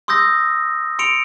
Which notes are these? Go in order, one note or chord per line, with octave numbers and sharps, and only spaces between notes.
C6 D#6 E6 G6 A#6
C6 C#7 D7 F7